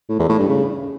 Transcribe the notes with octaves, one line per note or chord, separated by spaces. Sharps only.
A2
E2
A2
G2
C#3